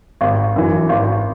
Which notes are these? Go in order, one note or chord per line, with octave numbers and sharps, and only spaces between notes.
G#1
F#2 E3
G#1